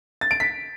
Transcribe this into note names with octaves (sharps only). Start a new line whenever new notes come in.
A6
D7
B6